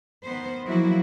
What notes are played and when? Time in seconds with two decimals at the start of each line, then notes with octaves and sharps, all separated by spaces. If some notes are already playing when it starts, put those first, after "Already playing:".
0.24 D#3 B3 C5
0.67 F3 F#3 A#3 E4 F#4